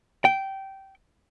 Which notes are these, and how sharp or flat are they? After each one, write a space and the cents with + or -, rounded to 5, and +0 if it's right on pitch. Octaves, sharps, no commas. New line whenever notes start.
G5 -15